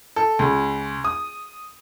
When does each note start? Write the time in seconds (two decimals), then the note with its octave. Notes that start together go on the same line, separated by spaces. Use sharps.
0.16 A4
0.39 C#2
1.04 D#6